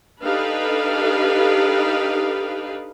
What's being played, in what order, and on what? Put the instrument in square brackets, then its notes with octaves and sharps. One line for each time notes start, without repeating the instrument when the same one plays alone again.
[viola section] D4 D#4 G4 A4 B4 F5